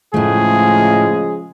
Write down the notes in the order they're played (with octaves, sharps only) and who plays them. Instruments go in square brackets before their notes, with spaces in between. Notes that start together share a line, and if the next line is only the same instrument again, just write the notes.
[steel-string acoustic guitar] A2 A3 [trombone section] C#3 F3 G#3 [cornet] G#4